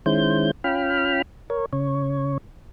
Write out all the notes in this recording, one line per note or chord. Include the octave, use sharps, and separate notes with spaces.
D#3 G#3 C#4 E4 C5 G6
C#4 F4 G5 B5 F6
A#4 C#5
C#3 C#5